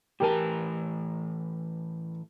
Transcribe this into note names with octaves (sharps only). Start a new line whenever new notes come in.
A2 E3 G4 A#4 G#5 A5